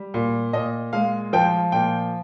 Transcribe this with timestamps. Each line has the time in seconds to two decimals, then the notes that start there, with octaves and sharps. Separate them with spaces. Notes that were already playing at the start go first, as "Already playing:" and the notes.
Already playing: G3
0.14 A#2
0.53 A#2 D#5
0.93 G#3 F5
1.33 F3 G5
1.72 A#2 G5